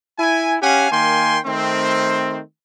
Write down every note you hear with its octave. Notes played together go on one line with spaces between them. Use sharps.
E4 G#5
C#4 G4 F5 F#5 G#5
D#3 A#3 G5 G#5 C6
D#3 A3 C4